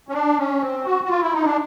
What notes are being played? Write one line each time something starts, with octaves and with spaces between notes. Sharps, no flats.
C#4
D4
C#4
C4
F#4
F#4
F4
E4
D#4
D4